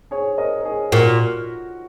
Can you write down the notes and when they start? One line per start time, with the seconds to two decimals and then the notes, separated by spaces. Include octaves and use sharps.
0.11 G#4 C#5
0.38 A#4 D#5
0.61 A#4
0.65 G#4 C#5
0.92 A#2 F#4 A#4